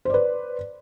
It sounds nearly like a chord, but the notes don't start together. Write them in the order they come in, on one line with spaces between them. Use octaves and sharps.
C5 D5 B4